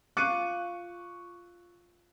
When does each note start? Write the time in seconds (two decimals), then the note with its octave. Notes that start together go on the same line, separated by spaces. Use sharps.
0.17 F4 C#6 D6 F#6 C#7 D#7